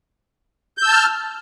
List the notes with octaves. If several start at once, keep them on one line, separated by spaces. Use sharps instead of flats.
A5 E6 F6 G6